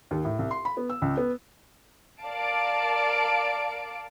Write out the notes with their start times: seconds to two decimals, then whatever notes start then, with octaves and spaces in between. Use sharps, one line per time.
0.11 D#2
0.24 A2
0.39 C2
0.51 C6
0.65 B5
0.77 B3
0.90 E6
1.02 C#2
1.17 B3
2.22 A#4 D5 F5 A5 D7